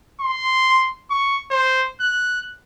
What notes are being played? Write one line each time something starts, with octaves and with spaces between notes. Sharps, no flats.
C6
C#6
C5
F#6